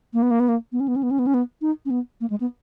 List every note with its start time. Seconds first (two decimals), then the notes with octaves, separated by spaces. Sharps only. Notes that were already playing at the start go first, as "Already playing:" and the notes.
0.14 A#3
0.22 B3
0.31 A#3
0.40 B3
0.49 A#3
0.72 B3
0.80 C#4
0.88 B3
0.96 C#4
1.03 B3
1.11 C#4
1.19 B3
1.27 C#4
1.34 B3
1.62 D#4
1.86 C#4
1.90 B3
2.21 A#3
2.30 G#3
2.40 B3